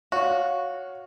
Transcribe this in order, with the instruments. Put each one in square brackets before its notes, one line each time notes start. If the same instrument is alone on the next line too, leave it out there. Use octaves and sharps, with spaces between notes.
[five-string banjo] F#4 [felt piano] C#5 F5